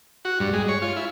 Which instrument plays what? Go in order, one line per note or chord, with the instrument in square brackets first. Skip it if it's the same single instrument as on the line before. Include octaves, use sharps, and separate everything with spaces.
[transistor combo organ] F#4
G2
G#3
C#5
F4
E4